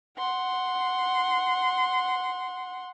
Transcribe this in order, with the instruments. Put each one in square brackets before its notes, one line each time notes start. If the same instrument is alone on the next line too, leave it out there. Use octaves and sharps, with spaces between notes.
[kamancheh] F#5 C6